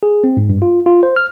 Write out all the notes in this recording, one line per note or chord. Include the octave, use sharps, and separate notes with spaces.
G#4
C4
G#2
G2
F4
F4
C5
F6